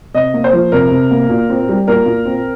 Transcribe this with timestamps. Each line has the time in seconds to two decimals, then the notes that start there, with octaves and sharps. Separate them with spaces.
0.15 C3 D#5
0.34 A#3
0.44 C5
0.53 F3
0.72 C3 A#4
0.91 C3
1.11 A#3
1.29 A#2
1.50 C4
1.69 G3
1.88 A#2 A#4
2.06 A#2
2.25 C4